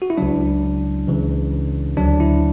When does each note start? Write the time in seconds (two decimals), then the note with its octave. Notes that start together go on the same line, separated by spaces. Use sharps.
0.02 F#4
0.10 E4
0.18 C#2 C#3 F#3 D4
1.07 C#2 C#3 E3
1.97 D2 D3 F#3 D4
2.20 E4